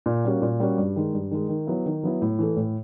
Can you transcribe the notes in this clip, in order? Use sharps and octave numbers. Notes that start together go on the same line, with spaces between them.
A#2
G3 A#3 C#4 F#4
A#2
G3 A#3 C#4 F#4
G2
D#3 G#3
G2
D#3 G#3
D#3
F#3 B3 E4
D#3
F#3 B3 E4
A2
E3 A3
A2